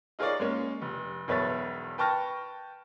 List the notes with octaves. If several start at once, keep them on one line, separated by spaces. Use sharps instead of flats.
D#4 F4 G#4 A#4 C#5 D5
G#3 A#3 C#4
F1
E1 B1 B4 C#5 E5 A6
B4 G5 A5 C#6 F6 A#6